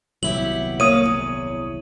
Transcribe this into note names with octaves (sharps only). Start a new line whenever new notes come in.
D#1 C2 F#3 B3 E4 G4 F#7
A#3 C#5 F5 D#6 D#7
E2